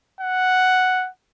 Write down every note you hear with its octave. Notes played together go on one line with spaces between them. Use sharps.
F#5